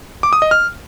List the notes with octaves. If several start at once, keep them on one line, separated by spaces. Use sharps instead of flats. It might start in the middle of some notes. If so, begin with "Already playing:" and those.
D6
D#6
D#5
F6